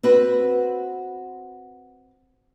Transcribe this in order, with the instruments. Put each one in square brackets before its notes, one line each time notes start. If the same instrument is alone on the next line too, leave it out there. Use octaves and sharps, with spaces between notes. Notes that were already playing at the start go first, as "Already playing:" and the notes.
[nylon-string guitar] C4 F#4 B4